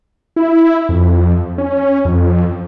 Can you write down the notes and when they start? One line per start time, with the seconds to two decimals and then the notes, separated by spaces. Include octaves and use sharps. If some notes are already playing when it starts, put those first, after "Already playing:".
0.36 E4
0.89 F2
1.58 C#4
2.05 F2